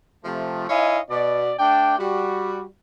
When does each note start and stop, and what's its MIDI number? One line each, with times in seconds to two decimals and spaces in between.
0.25 0.68 48
0.25 0.68 53
0.25 0.68 57
0.69 1.00 63
0.69 1.00 64
0.69 1.00 73
0.69 1.00 75
0.69 1.00 77
0.69 1.00 80
1.10 1.52 47
1.10 1.52 74
1.59 1.96 57
1.59 1.96 62
1.59 1.96 74
1.59 1.96 79
1.99 2.65 55
1.99 2.65 66